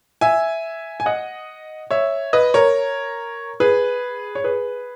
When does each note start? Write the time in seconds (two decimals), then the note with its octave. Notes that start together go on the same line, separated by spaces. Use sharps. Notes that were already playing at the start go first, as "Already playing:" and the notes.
0.21 E5 G#5
1.00 G#5
1.06 D#5 F#5
1.91 C#5 E5
2.33 B4 D#5
2.54 A#4 C#5
3.60 G#4 B4
4.35 C#5
4.44 G#4 B4